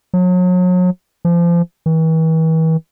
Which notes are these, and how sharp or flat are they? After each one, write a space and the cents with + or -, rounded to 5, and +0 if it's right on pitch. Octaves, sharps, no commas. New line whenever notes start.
F#3 -35
F3 -30
E3 -40